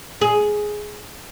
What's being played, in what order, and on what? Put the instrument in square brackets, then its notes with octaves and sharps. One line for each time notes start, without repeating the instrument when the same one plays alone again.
[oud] G#4